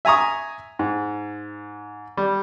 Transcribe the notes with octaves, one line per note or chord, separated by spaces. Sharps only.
E5 G#5 A#5 C#6 D#6
G#2
G3